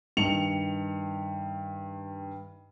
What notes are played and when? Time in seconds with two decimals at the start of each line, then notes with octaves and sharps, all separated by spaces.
0.17 G2 D#3 C#7 F7